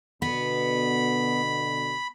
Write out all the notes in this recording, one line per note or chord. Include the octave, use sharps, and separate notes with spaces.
B2 D3 B3 B5